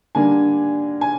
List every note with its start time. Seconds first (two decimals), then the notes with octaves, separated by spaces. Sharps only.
0.15 D3 G3 A#3 D4 G#5
1.01 G#5